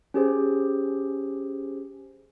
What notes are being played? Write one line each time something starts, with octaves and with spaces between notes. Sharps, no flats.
C#4 G4 G#4 C5